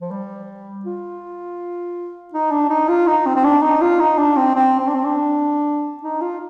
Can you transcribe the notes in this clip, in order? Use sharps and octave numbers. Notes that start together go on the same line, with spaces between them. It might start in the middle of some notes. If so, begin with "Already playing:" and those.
F3
G3
F4
D#4
D4
D#4
F4
D#4
C4
C4
D4
D#4
F4
D#4
D4
C4
C4
C4
D4
C4
D4
D#4
F4